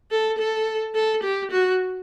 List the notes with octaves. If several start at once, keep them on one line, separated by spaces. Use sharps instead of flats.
A4
A4
A4
G4
F#4